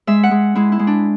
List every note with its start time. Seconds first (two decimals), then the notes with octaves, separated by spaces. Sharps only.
0.07 G#3 E5
0.23 F#5
0.31 G#3
0.55 G#3 E4
0.72 E4
0.79 G#3
0.87 D4